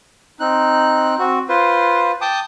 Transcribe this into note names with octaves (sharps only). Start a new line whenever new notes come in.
C4 D#4 F#6
C4 F#4
F4 B4 C5
G5 A5 D6 D#6